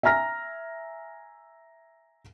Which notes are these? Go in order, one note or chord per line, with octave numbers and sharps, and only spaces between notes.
E5 G#5 A#5 F6 A#6